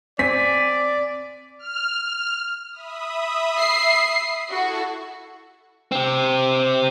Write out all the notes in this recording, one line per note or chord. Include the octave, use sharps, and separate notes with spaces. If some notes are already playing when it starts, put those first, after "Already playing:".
C4 D5 G#5 B6
F6
E5 B5 D#6
C7
E4 F#4 A4 C#6
C4 G4